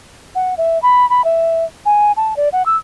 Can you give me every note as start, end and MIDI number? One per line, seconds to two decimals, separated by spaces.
0.35 0.54 78
0.58 0.81 76
0.82 1.08 83
1.10 1.24 83
1.24 1.65 76
1.85 2.12 80
2.16 2.36 81
2.36 2.49 74
2.52 2.65 78
2.66 2.76 88